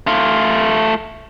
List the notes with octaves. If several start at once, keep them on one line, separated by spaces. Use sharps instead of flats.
A3 F4